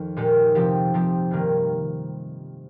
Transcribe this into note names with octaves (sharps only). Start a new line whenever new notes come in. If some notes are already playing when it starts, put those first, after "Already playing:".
Already playing: F2 D#3 C4
A#2 G#3 D#4 G4
C3 F3 C4 G4
C3 F3 C4 G4
G2 D#3 G3 A#3 F4